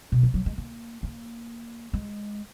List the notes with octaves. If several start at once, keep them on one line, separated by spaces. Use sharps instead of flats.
B2
F3
F#3
G#3
A#3
A#3
G#3